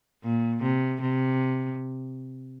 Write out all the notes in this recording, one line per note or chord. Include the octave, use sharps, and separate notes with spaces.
A#2
C3
C3